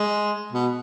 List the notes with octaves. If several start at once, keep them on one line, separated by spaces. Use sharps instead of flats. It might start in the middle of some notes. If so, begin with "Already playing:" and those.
Already playing: G#3
B2